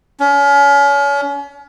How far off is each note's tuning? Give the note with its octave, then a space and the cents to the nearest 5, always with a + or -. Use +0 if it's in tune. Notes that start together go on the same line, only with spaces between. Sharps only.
C#4 +35